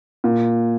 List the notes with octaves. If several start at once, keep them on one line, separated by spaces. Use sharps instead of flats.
A#2